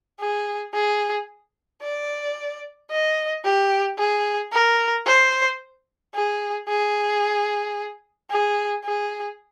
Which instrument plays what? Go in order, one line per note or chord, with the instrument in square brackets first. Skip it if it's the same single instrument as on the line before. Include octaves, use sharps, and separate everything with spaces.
[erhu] G#4
G#4
D5
D#5
G4
G#4
A#4
C5
G#4
G#4
G#4
G#4